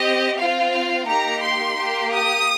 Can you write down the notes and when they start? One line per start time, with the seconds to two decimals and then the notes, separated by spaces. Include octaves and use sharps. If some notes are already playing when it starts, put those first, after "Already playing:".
Already playing: C4 G4 D#5
0.36 C4 F4 F5
0.71 F5
1.06 A#3 D#4 G4 A#5
1.41 C6
1.77 A#3 G4
2.12 D#6